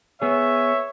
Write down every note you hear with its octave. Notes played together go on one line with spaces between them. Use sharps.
B3 G#4 C#5 E5